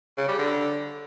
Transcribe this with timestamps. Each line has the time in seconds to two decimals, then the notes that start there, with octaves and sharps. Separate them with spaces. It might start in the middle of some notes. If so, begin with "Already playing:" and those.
0.17 C#3
0.28 G3
0.38 D3